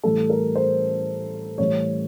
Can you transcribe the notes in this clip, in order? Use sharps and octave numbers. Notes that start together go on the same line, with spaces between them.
A2 E3 G3 A4
A#4
C5
A2 E3 G3 C#5